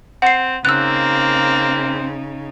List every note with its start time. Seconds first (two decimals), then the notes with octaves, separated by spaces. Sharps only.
0.22 C4 F#5 C7
0.65 C#3 A#3 C4 D#4 E6 F#6